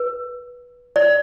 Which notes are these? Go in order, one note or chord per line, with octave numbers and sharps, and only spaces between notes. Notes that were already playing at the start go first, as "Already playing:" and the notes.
Already playing: B4
D5